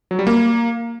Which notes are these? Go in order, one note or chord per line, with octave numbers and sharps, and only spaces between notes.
F#3
G3
A#3